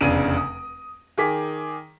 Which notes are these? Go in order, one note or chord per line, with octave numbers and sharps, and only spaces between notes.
F1 E2 C#3 D4 D7 D#7
D#6
D#3 G#4 D6 B6